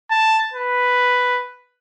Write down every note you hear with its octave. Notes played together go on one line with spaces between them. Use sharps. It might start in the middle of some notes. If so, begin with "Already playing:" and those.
A5
B4